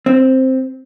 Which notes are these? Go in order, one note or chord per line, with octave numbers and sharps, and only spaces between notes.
C4